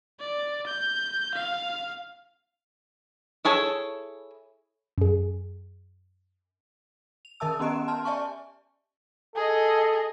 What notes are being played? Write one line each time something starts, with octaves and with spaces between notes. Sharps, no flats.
D5
G6
F5
E4 G#4 A4 C#5
F#2 G#4
F7
D#3 A#4 E5 A5 E6
B3 C#4 G4 D#5 D7 E7
A5 C6 F6
D5 E5 G#5 A5 C#6
G#4 A4 D#5